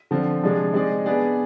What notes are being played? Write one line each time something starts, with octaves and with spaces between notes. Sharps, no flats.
D3 F3 C4
C3 F3 G#3 D4
G#3 C4 D#4 G#4 D5
B3 D4 G#4 D5